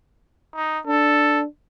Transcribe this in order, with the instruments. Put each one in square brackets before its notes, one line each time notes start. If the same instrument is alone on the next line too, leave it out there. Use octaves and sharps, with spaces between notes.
[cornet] D#4
[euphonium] D4 [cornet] A4